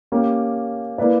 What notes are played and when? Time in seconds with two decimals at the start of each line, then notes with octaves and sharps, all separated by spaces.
0.12 A#3 C#4 G4
0.98 A#3 E4 B4 D5